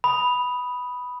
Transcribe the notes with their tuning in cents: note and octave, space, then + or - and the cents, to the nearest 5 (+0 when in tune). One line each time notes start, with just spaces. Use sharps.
B5 +0 D#6 +0